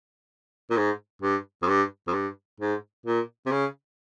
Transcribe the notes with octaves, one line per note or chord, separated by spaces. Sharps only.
A#2
G#2
G2
F2
G2
F2
G2
G#2
A#2
C3
C#3